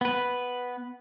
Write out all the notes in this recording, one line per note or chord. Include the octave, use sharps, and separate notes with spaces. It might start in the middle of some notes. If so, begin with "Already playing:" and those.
B3 B4